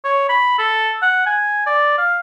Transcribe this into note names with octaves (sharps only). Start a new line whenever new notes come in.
C#5
B5
A4
F#5
G#5
D5
F5